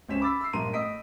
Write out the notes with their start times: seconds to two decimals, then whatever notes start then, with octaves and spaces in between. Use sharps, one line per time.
0.09 C#2 C4 C#4 B6 E7
0.21 B5 D6 E6 A6 B6
0.41 E6 C7
0.53 A#1 G2 A#3 A#5 C6 D#7
0.73 A2 D#5 D#6 B6 D7